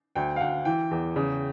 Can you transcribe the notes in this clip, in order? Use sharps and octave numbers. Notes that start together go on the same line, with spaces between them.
D2 G5
F5
D2 F#5
E3 G5
E2
C#3